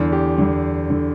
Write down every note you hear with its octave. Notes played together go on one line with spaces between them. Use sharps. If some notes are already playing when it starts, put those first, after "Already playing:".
Already playing: E2 D3
G4
E2 D3
D3